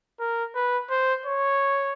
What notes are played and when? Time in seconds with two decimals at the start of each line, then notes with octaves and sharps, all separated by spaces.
0.20 A#4
0.55 B4
0.90 C5
1.26 C#5